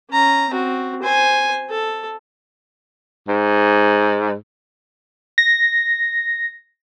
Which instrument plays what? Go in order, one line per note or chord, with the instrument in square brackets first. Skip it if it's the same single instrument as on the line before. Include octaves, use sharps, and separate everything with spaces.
[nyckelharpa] C#4 A#5
C4 F#4
C5 G#5
A4
[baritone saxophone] G#2
[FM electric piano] A#6